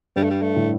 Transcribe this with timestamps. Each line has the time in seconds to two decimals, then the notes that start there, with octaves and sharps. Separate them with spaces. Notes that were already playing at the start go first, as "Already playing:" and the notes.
0.16 G2 G3
0.23 A3
0.30 G3
0.42 A3
0.56 A2